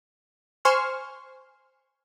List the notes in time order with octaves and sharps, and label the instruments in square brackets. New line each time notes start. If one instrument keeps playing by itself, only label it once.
[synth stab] C5 G#5 C6 C#6 F6